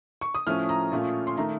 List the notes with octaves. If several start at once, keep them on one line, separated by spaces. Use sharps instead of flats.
C#6
D#6
A2 F3 A3 C#4 F6
A#5
A#2 A3 C#4 F4
C6
D#3 A3 A#5